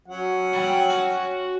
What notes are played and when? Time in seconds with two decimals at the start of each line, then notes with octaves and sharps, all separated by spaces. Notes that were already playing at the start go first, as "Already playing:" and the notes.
0.08 F#3 C#4 F#5
0.53 G3 G5
0.90 F#4